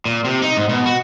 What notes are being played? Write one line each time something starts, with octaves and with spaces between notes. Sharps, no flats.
A#2
C3
D#4
G#2
B2
F#4